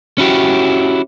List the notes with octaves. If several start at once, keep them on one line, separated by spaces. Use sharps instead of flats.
C#4 E4 F#4 G4